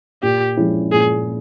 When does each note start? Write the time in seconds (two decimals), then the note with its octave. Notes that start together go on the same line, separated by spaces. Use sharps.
0.23 A#2 G4
0.57 F3 G#3 C#4 E4
0.92 A#2 G#4